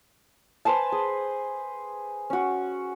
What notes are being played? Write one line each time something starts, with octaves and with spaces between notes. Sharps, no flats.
B4 C5 G#5 A5
G#4
C#4 F#4